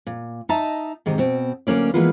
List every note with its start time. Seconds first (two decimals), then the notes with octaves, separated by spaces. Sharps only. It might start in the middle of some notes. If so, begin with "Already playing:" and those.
0.07 A#2
0.49 D#4 D#5 E5 A5 A#5
1.06 G#2 C3 D#3 D#4
1.18 B2 C4
1.67 D2 F#3 A#3 C#4 D5
1.94 E3 F3 G#3 A#3 B3 F4